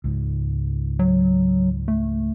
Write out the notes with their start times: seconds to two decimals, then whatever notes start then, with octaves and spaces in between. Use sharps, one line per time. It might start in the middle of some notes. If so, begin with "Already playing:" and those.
0.04 C#2 G#2
0.99 F#3
1.88 A3